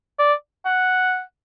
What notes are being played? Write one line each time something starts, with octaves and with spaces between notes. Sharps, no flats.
D5
F#5